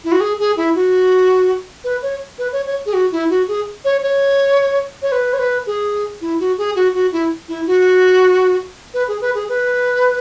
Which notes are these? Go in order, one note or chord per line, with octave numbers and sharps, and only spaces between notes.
E4
F#4
G#4
G#4
E4
F#4
B4
C#5
B4
C#5
C#5
G#4
F#4
E4
F#4
G#4
C#5
C#5
C#5
B4
C#5
B4
G#4
E4
F#4
G#4
F#4
F#4
E4
E4
F#4
B4
G#4
B4
G#4
B4